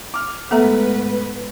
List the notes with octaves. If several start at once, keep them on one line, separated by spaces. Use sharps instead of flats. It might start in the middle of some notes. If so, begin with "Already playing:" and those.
D6 F6
G#2 A3 B3 A4 B4 E5 F#5 A#5